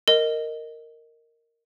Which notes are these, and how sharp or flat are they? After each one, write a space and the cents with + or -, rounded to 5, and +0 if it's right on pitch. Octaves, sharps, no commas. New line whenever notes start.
A#4 -10 D#5 +0